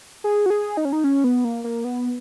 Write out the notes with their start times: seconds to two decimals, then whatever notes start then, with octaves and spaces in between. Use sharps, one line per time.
0.24 G#4
0.46 F#4
0.50 G#4
0.77 D#4
0.85 C#4
0.93 D#4
1.04 C#4
1.24 B3
1.45 A#3
1.64 A#3
1.84 B3